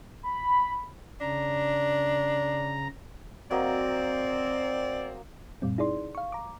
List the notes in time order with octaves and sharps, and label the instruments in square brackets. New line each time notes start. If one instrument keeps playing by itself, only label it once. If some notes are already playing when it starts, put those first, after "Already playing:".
[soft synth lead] B5
[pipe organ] C#3 A#5 [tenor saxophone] D4
[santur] F#3 A#3 D#5 [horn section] C4 [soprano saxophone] D5
[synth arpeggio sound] F#2 A#2 G3 C4
D#4 E4 G#4 D5 C6
F5 C#6
A#5 D6